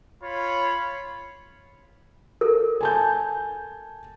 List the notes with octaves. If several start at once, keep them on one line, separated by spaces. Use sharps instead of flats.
F4 C#5 B5
A4 A#4
G#5 A5 G6